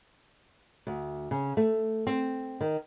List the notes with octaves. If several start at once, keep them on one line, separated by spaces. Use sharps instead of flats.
D2
C#3
A3
C4
D#3